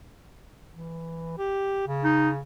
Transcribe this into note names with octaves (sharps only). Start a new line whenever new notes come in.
E3
G4
C#3
D#4